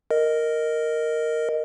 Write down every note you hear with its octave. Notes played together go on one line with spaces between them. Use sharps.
A#4 D#5